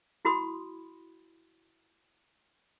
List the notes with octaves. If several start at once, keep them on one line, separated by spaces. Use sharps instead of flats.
E4 F#4 B5 C6 D#6